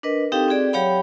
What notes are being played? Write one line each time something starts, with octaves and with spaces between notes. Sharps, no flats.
D4 A#4 B4 D#5
C4 D#4 G4 A4 F5 G5
C4 F#4 G#4 D5
F#3 G4 C#5 F5 G5 B5